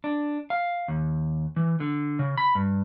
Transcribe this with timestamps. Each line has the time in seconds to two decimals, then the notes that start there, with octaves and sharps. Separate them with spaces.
0.04 D4
0.50 F5
0.88 D#2
1.56 E3
1.80 D3
2.19 C#3
2.37 B5
2.55 G2